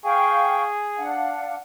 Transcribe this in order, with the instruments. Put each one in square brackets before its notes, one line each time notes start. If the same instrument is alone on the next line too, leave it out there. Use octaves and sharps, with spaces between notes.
[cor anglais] G#4 [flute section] F5 G5 C#6
[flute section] D4 F5 F#5